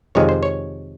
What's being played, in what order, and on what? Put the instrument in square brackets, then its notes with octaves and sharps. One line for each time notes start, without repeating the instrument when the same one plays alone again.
[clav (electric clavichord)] F2 C3 D#3 G#3 C#5
C5
C#5